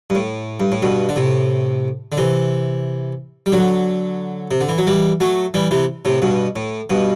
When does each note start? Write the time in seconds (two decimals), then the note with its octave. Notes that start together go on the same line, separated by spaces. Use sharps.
0.10 G2
0.15 A2
0.60 G2
0.72 A2
0.82 G2 B2
1.09 D3
1.16 A2 C3
2.12 D3
2.17 C3 E3
3.46 G3
3.52 D3 F#3
4.51 C3
4.61 D3
4.69 E3
4.78 F#3
4.87 E3 G3
5.20 F#3 A3
5.54 E3 G3
5.71 C3 E3
6.05 A2 C3
6.22 G2 B2
6.56 A2
6.90 G2 B2